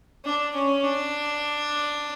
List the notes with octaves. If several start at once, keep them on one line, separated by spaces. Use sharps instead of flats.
D4
C#4
D4